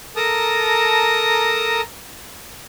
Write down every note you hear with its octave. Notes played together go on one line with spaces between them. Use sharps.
A4 A#4 A5 A#5 D#6